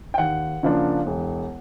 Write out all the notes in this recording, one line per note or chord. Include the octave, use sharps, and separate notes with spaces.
G5
D#2 F#5
C#3 F3 A#3 D4
E1